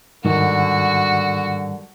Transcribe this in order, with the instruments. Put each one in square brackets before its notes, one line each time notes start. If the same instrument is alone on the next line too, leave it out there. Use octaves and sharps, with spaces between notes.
[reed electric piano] G#2 D#3 [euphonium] D3 [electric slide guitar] G3 A#4 [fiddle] F#4